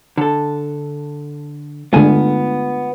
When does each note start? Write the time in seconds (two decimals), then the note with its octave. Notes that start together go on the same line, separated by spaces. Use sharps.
0.18 D3 A4
1.93 D3 G#3 A3 B3 F4 G#5